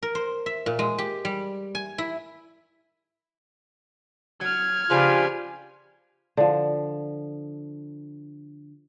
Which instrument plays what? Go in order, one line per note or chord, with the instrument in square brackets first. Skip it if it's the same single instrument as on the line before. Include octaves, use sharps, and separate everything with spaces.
[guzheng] A#4
C5
E5
A#2
G#3
G4
G3
G#5
E4
[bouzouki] F#3 [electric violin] F6 G#6
[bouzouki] C#3 B4 G#5 [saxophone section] F3 D4 G4 [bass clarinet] F4
[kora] D3 F3